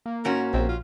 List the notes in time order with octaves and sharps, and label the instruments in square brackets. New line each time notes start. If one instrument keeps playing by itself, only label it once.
[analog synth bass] A#3
[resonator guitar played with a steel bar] G#2 C#4 F#4 [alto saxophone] A#4
[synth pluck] A#1 [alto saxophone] C4
[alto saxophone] F4